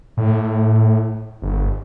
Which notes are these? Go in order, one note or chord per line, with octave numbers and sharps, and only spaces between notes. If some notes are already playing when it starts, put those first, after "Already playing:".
A2
G1